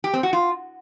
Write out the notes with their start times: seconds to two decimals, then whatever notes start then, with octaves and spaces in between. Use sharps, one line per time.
0.04 G4
0.14 C4
0.23 F#4
0.33 F4